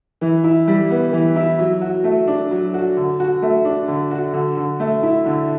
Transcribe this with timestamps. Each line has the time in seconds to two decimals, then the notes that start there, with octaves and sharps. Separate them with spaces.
0.21 E3
0.44 E4
0.68 G3
0.90 B3
1.12 E3
1.36 E4
1.59 F#3
1.81 F#4
2.04 A3
2.27 D4
2.51 F#3
2.74 F#4
2.97 D3
3.20 F#4
3.42 A3
3.65 D4
3.88 D3
4.11 F#4
4.33 D3
4.57 D3
4.80 A3
5.03 E4
5.26 D3